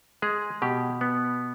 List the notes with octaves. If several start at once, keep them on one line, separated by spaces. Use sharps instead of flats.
G#3 G#4
B2 G4
B3